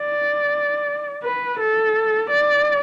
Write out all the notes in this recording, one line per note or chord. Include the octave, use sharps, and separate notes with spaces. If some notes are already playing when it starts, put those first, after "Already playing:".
Already playing: D5
B4
A4
D5